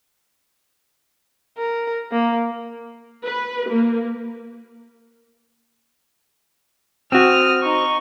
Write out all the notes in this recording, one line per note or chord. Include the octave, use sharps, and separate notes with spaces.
A#4
A#3
B4
A#3
C4 F#4 D#6 F6
D#4 C#6